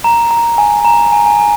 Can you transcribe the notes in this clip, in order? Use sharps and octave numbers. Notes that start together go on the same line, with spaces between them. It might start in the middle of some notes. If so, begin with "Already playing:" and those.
A#5
A#5
G#5
G#5
A#5
G#5
A#5
G#5
G#5